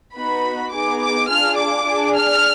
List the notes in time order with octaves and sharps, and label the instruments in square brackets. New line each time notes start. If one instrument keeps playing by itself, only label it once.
[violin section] B3 D#4 F#4 B5
B3 D#4 G#4 D6
D6
D4 F4 G#4 F6
D6
D4 G#4
F6